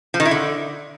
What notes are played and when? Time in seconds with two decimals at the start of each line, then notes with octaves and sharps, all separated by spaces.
0.14 F3
0.20 D#3
0.26 E4
0.31 D3